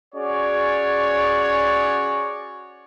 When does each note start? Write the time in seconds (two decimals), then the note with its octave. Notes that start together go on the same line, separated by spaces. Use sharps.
0.15 C#4 F#4 G#4 C#5 D5